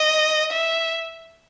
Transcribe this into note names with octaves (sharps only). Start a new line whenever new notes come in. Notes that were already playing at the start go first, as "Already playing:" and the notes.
Already playing: D#5
E5